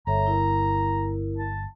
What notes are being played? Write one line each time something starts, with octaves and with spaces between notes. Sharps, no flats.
G1 A4 C#5 E5 A#5
E4 A#4
A5